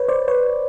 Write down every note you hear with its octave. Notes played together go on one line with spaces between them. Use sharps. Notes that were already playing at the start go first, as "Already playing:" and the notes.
Already playing: B4 C#5
C5 D5
B4 C#5